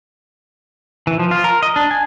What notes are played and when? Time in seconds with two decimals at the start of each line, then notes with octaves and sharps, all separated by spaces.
1.07 E3
1.19 F3
1.31 F4
1.44 A#4
1.63 D#5
1.76 D4
1.91 G#5